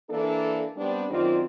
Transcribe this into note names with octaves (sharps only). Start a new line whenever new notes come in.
E3 A#3 D4 A4
G3 B3 C4 D4
F#2 D#3 F#3 C4 F4 D5